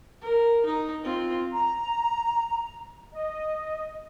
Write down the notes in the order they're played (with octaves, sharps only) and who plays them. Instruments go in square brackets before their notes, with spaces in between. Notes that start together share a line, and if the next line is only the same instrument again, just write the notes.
[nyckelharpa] A#4
D#4
C4 F4
[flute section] A#5
D#5